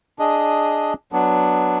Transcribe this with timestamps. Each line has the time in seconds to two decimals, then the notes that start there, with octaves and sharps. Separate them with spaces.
0.19 D4 G#4 D#5
1.12 F#3 B3 D4